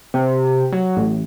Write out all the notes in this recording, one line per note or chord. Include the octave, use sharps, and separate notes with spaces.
C3
F#3
A1